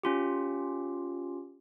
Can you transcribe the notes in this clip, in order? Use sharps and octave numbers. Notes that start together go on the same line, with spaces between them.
C#4 F4 G4